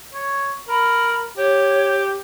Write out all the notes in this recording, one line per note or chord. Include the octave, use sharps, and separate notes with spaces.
C#5
A#4 B5
G4 C#5